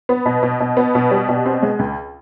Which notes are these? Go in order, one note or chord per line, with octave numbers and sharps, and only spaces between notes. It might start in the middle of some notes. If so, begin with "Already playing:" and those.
B3
B2
B2
B2
B3
B2
G3
B2
C4
G#3
C#2